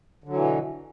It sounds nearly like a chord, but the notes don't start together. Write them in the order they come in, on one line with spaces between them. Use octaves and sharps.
D3 F#3 E3 B2